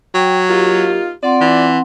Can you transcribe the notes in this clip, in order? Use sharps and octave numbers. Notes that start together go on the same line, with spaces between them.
F#3 G5
A#3 D#4 F4 G4
C4 F4 D5 F#5 C6
E3